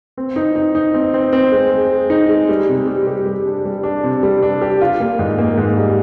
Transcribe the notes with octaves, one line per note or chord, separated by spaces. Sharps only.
C4
D#4
D#4
D#4
C4
C4
C4
G#3
G#3
G#3
D#4
G#3
G3
C3
G3
G4
G3
D4
G3
D4
C3
G3
D4
G4
F4
A#3
G#2
A#3
G#2
G3